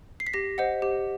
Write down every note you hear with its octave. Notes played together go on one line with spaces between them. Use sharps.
C7
B6
G4 A#6
C5 D#5 F#5
G4